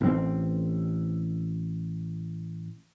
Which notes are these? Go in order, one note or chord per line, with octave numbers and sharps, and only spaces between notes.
A1 C4